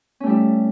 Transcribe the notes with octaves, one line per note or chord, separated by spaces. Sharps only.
G3 A3 C#4 E4